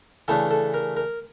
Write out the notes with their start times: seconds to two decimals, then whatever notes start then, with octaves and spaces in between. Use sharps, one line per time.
0.28 C#3 E3 A3 D4 A4
0.51 A4
0.74 A#4
0.97 A#4